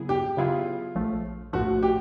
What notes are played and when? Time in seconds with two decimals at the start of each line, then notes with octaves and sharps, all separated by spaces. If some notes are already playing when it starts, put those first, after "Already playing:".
Already playing: C#3 F#3 B3 E4 G#4
0.09 G4
0.37 C#3 F#3 B3 E4 F4 G#4
0.95 A#1 A2 F3 A3
1.53 A#1 A2 F3 A3 F#4
1.83 G4